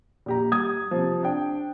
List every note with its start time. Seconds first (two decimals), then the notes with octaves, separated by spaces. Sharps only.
0.26 A#1 G4 A#5
0.52 G3 D#6 G#6
0.91 C3 F3
1.23 D4 G5